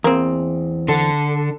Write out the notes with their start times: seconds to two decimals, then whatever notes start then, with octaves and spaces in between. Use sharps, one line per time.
0.04 E2 A#3 C4
0.88 D3 A4